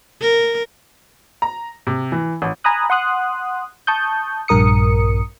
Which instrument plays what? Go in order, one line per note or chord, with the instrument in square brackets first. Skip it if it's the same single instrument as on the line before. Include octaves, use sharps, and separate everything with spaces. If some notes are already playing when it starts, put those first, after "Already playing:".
[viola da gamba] A#4
[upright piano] A#5
C3
E3
A1
[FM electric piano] G#5 A#5 B5 D#6 F#6
F#5 C6 D#6 F#6
A5 C#6 D#6 G6
A#1 G2 A#4 D#6 C#7